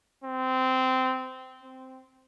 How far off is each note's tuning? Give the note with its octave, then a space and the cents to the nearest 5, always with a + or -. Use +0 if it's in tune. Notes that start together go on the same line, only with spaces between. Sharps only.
C4 -15
C4 -5